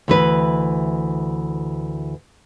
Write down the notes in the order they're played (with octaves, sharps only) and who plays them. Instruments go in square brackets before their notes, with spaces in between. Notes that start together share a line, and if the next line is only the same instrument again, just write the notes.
[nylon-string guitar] D2 E3 B4